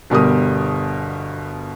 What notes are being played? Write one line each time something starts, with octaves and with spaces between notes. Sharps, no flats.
G1 B2 G3 A#4 D#6